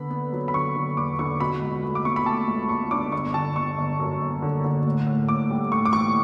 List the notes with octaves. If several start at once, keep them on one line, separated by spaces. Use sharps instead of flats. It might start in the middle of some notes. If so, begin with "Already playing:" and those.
Already playing: D3 B3 B5
B3
F#3
B5
D3 C#6
D3
E2 D6
D3 C#6
B2 B5
C#2
A3
D6
B2 C#6
B5
A3 A5
C#2
C#2 C#6
D4 D6
G1 C#6
D3 A5
G1 C#6
G1
F#2
G1
D3
D3
A2
A2
A2 D6
G3
A2 C#6
D6
E3 C#6